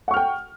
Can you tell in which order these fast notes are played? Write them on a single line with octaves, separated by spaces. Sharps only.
F#5 C#6 F6 G5